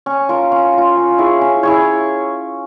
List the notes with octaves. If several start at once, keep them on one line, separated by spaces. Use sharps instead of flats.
C#4
F4 A#4
C#4
F4 A#4
C#4
E4 G#4 C#5
C#4
E4 G#4 C#5